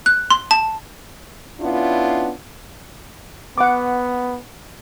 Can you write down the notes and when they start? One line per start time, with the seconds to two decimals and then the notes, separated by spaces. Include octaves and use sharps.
0.06 F#6
0.31 C6
0.51 A5
1.60 B3 C#4 D4 E4 F4
3.58 B3 F#5 D6